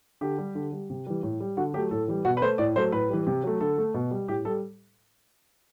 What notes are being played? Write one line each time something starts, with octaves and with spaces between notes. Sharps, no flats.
D3 G4
G3
D3
G3
C3
E3 G3
A2
G3
D3 F#4
F#3 A3 G4
A2 A4
E3 G3
B2 F#4
B4
A3 C5
A2 D5
F#3 A3 C5
A2 B4
E3 G3
C3
F#3 A3
D3 A4
A3
B2
G3
A2 G4
G3 A4